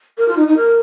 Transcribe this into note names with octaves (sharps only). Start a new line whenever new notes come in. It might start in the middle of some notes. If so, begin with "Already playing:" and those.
A#4
F4
D#4
D#4
A#4